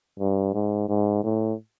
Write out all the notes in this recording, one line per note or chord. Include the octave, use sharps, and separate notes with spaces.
G2
G#2
G#2
A2